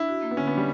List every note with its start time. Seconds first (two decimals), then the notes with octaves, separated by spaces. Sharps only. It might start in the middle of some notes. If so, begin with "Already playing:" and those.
Already playing: D4 E4
0.09 F#4
0.22 A#3
0.31 B3
0.37 D3 C#4
0.47 B3
0.52 D4
0.58 G3